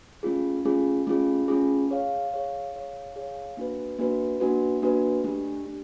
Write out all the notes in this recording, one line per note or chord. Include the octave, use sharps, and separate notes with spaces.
A3 C#4 F4 G#4
A3 C#4 F4 G#4
A3 C#4 F4 G#4
A3 C#4 F4 G#4
G#4 C#5 F5
G#4 C#5 F5
G#4 C#5 F5
G#4 C#5 F5
A#3 D4 F#4 B4
A#3 D4 F#4 B4
A#3 D4 F#4 B4
A#3 D4 F#4 B4
A3 D4 G4
A3 D4 G4